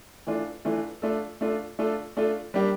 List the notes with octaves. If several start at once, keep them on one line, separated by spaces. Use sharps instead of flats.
E3 A3 D4 F4
E3 A3 D4 F4
A3 D4 F4 A4
A3 D4 F4 A4
A3 D4 F4 A4
A3 D4 F4 A4
G3 A#3 D4 G4